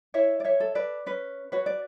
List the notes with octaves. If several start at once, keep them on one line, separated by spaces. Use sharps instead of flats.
E4 C#5 E5
D5
C#5 E5
A4
B4 D5
C#4 B4
F#4 B4 C#5
D5